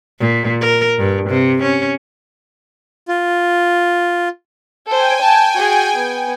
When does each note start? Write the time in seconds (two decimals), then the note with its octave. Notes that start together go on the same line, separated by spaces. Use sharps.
0.19 A#2
0.61 A#4
0.98 G2
1.29 C3
1.62 C#4
3.08 F4
4.87 A4 C5 G5 G#5
5.21 A5
5.55 F#4 G#4
5.96 B3